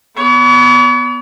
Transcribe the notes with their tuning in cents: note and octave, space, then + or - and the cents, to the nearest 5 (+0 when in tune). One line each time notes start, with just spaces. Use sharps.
B3 +0 C#5 +45